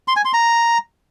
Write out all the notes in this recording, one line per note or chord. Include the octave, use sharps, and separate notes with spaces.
C6
G#5
C6
A#5